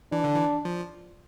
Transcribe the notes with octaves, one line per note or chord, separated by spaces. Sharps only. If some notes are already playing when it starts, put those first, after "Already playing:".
E3 D4
D3
E3
F3